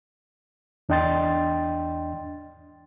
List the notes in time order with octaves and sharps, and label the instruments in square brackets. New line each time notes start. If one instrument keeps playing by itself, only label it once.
[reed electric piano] E2 D4 D#5 G5 C6 A6